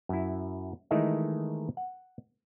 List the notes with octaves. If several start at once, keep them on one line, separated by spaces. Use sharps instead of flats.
F#2 E4
D#3 E3 G#3 A3 D#4 E4
F#5